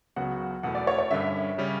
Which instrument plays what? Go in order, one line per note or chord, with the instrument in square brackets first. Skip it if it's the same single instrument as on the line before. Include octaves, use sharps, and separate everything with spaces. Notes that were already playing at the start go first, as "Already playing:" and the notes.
[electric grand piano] C#2 C#3 F#3 B3 F#4 [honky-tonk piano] F#5
[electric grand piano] E2 B2 A3 E4 [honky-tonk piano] F#5
[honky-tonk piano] D5
C#5
C#5
[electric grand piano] G2 D3 G3 C#4 [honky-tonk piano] E5
[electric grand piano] C#3 G3 C#4